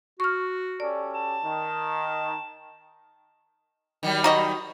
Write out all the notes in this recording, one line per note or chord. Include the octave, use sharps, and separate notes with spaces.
F#4 C#6 F6
C#4 G4 A4 D5
A5
D#3
D#3 F#3 G3
D#4 F#4 D#5